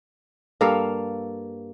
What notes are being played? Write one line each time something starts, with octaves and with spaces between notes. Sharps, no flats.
G2 A#3 A4 F5